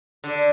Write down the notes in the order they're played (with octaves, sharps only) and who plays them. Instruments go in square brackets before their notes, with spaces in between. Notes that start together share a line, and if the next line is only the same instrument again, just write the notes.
[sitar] D3